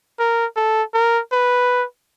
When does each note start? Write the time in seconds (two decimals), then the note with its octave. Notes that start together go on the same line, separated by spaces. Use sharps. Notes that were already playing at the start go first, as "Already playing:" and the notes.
0.19 A#4
0.56 A4
0.94 A#4
1.32 B4